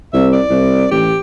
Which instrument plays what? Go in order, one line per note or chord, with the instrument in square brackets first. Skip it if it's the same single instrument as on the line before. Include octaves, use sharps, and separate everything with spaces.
[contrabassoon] C2 [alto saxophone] E5
[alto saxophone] D5
[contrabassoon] C2
[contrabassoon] A1 [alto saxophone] G4